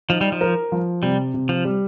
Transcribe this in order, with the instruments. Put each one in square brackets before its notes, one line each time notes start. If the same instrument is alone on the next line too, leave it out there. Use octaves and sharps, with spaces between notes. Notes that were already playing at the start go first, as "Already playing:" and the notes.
[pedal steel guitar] F3 [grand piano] D#4
[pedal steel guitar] G3
F3
[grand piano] A#4
F3
[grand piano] C3 [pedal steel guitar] G3
[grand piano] C3
[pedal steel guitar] F3
[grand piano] G3